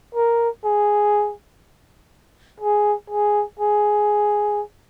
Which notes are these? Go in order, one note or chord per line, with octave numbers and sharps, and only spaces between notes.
A#4
G#4
G#4
G#4
G#4